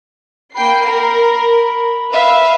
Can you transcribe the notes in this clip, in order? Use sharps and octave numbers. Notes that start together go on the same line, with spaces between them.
A#3 G5 B5 C7
A#4
B4 E5 F5